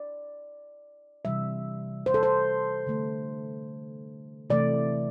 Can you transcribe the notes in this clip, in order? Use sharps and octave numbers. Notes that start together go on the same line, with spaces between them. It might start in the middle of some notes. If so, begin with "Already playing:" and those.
Already playing: D5
C3 E3 G3 E5
C5
A4
C5
D3 A3
C3 E3 A3 D5